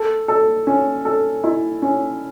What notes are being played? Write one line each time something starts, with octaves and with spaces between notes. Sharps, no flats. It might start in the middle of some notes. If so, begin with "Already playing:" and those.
Already playing: A4
A4
C#4
A4
E4
C#4